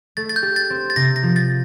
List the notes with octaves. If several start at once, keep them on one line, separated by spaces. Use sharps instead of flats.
A3 A6
A6
G6
G4
A6
C4
A6
C3 A#6
A#6
F3
A6